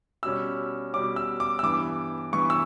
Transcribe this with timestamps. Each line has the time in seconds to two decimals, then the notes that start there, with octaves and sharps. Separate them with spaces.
0.23 B2 G3 C#4 E6
0.93 B2 G3 C#4 D6
1.16 E6
1.40 D6
1.59 E6
1.63 G2 E3 B3 D6
2.32 G2 E3 B3 C#6
2.50 E6